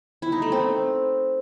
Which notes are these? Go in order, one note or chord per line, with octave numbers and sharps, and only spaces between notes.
E4
D#4
A3
C4